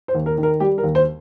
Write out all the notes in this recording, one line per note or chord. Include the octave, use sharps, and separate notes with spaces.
C5
D#2
A#4
D#3
A#4
G3 G4
A#4
D#2
C5